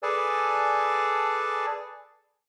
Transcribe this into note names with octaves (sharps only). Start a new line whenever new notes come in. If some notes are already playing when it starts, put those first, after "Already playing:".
G#4 A4 B4 D5 G#5 A5